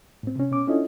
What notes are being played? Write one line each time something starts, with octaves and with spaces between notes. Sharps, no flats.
A2 C4
C3 C#4
B2 C#4 D6
C#4 D4 E4 F4 A4 D#5